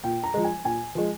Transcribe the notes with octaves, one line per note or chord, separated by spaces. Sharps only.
A#2 G5
A#5
F3 G#3
G#5
A#2 G#5
F3 G#3